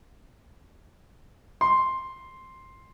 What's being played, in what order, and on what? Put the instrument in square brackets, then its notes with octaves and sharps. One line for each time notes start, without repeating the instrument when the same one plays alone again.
[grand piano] C6